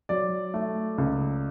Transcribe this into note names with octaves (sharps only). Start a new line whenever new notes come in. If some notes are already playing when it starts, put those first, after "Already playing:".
F#3 D5
A3
C#2